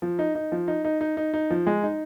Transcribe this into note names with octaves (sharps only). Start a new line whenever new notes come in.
F3
D#4
D#4
F3
D#4
D#4
D#4
D#4
D#4
F3
G#3
D#4